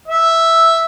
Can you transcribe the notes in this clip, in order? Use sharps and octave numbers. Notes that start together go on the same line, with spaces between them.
E5